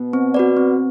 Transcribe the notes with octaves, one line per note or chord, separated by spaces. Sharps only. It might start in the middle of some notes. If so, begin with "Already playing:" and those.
Already playing: B2
C4
F#4 B4 D5
C4